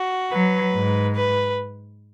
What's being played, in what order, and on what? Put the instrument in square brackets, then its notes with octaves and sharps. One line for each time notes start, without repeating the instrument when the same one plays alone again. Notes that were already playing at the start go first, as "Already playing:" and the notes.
Already playing: [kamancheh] F#4
[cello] F#3 [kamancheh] B4
[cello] G#2
[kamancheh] B4